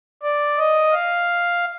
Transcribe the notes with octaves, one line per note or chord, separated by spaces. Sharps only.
D5
D#5
F5